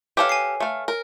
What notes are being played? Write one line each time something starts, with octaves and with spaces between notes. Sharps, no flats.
G4 A4 B4 C#5 F5 G#5
G#5 C7
A3 F5
A#4